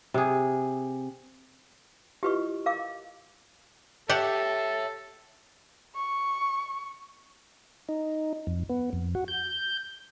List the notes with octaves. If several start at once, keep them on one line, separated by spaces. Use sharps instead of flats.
C3 G#4
E4 F4 G4 B4 D#5 C#6
A#4 F5 D6
G4 A4 C#5 E5 F#5 A5
C#6
D#4
F2
B3
F2
F#4
G6